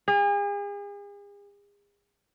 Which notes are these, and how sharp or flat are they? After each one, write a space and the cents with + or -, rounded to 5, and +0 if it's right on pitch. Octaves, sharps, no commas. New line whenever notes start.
G#4 -40